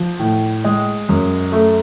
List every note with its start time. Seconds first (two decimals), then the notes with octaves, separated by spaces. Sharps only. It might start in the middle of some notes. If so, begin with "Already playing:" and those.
Already playing: F3
0.19 A2
0.64 G#3
1.09 F#2
1.52 A3